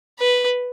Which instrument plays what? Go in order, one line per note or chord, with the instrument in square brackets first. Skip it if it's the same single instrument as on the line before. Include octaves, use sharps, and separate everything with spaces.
[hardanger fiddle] B4